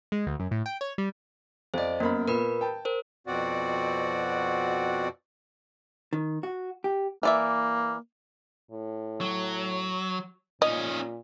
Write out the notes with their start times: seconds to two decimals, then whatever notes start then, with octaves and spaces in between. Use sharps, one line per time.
0.12 G#3
0.26 D2
0.40 F#2
0.51 A2
0.66 G5
0.81 C#5
0.98 G3
1.74 F2 C5 D5 D#5
2.00 F#2 A#3 B3 A#4 B5
2.28 A#2 A#4 B4 B5
2.61 G5 A5
2.85 A#4 C5
3.27 F2 B2 C4 F#4 D5 F#5
6.13 D#3
6.43 F#4
6.84 G4
7.23 E3 A#3 D5 E5
8.72 A2
9.21 F#3
10.62 A#2 C#4 D#4 D#5